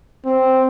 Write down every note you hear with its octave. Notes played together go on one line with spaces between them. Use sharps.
C4